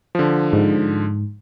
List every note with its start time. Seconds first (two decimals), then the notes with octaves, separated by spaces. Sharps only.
0.15 D3 F3
0.53 G#2